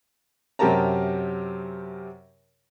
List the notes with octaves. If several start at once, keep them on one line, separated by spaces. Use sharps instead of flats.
F#2 C3 G4 A#4 A5 A#5